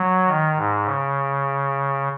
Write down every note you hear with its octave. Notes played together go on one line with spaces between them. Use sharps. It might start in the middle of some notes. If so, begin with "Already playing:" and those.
Already playing: F#3
D#3
G#2
C#3